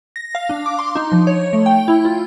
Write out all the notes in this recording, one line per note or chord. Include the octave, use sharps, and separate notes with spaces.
A#6
F5
D4
D6
C6
D#4
F3
C#5
A3
G5
E4
F4